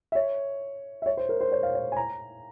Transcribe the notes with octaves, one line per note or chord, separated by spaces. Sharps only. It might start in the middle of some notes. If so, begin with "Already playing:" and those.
E5
C#5
E5
C#5
C5
A#4
C5
C#5
F5
C#5
G#5
A#5